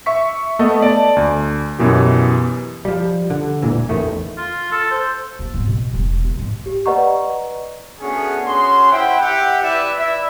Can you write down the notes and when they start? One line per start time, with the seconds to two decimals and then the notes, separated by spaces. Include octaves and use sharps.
0.06 E5 C#6 B6
0.59 A3 B3 A4 D#5
0.82 D5 A5
1.16 D2
1.79 F#2 B2 E3 G4
2.85 F3 G3
3.30 D3
3.62 E1 A#2 E3
3.89 A1 E2 D#3 A3
4.37 F4
4.72 A4
4.91 C5
5.39 A#3
5.54 G#2
5.67 B2
5.94 E1
6.25 D#3
6.36 G#2
6.66 G4
6.86 B4 D5 D#5 F#5 A#5 C#6
8.00 A3 B3 C#4 D4 F#4 G#4
8.46 C#4 F#4 G#4 C6
8.90 E4 C5 E5 F#5 G5
9.19 G4 E5 F#5 G5
9.61 E4 B4 D5 E5
9.97 E4 D5 E5